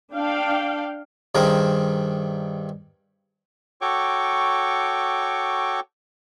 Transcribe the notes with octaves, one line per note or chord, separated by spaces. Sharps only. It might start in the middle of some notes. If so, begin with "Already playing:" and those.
D4 F5 G5
G2 D#3 C4 G#4 A#4 C5
F#4 A4 C#5 G5 C#6 D6